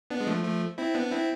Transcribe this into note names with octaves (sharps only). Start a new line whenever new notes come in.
B3 D4
G#3
F3 A3
F3 A3
C4 E4
B3 D4
C4 E4